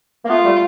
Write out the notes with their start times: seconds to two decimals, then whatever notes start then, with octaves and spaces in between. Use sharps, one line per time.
0.25 A#3
0.29 A3 B3 F4
0.44 G3 A3